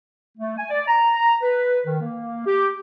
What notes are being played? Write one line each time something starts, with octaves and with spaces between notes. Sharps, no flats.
A3
G#5
D5
A#5
B4
D#3
A#3
G4